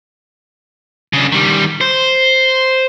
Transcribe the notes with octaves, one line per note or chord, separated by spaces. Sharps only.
C#3 D4
D#3 G3
C5